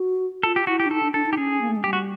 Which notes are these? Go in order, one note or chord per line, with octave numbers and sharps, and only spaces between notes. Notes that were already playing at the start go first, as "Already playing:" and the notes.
Already playing: F#4
F4 A4
G4
E4 F#4
G4
D4
D#4 A4
D4
D4 A4
D#4
G4
C#4 G#4
A#3
A3
G#3
G3 G4
F#4